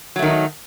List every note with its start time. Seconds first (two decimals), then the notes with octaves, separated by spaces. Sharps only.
0.16 F#3
0.19 A3
0.22 D#3
0.26 D#4